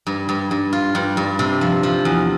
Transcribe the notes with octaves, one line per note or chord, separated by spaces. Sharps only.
G2
G2
G2
F4
G2
G2
C3
F3
F3
E2